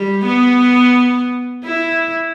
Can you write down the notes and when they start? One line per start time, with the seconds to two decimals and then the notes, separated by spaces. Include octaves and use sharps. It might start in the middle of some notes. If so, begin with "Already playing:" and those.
Already playing: G3
0.25 B3
1.65 E4